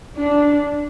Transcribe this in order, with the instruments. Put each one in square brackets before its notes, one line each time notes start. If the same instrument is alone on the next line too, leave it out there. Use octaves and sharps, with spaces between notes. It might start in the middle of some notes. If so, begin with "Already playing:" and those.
[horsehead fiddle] D4